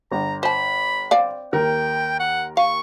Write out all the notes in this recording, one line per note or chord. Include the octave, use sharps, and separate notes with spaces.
G1 A#5
C5 A5 B5
C4 D5 F5
D#2 A#4 G5
F#5
F5 C#6